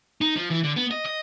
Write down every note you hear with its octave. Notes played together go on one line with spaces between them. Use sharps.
D#4
F3
E3
D3
B3
D#5
D#5